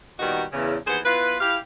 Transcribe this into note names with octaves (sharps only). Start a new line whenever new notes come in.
A#2 D#3 G3 B3 D#4 F#4
E2 C#3
D#2 E3 B3 G#4 C5
B3 E4 F4 B4
E4 G4 F5